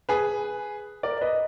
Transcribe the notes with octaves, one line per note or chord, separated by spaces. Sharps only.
G#4 B4
A#4 D5
B4 D#5